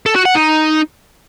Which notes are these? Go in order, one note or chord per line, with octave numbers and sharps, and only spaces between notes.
A4
F#4
F#5
D#4